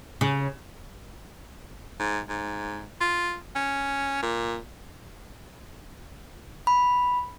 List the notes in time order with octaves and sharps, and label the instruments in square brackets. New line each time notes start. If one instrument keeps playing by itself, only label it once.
[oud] C#3
[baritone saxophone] G#2
G#2
F4
C#4
A#2
[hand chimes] B5